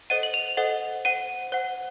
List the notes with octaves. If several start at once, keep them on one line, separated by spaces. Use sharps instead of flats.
A4 C5 D#5 F#5 D#7
F#7
F7
A4 C5 D#5 F#5
C5 F#5 D#7
C5 F#5